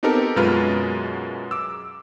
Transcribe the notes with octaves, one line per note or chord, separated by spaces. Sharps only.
B3 C4 D#4 G4 A4 A#4
F#2 B2 G#3 F4 B4 F6
D6 E6